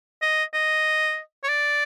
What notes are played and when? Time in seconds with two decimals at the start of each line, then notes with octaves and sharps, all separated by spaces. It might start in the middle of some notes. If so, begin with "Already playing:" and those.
0.22 D#5
0.54 D#5
1.44 C#5
1.49 D5